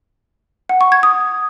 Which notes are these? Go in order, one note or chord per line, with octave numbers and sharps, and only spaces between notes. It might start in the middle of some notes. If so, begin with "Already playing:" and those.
F#5
C#6
G#6
D#6